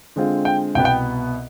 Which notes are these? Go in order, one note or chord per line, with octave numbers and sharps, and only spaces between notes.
D3 G#3 C4 F4
G5
C2 B2 B3 G5
G5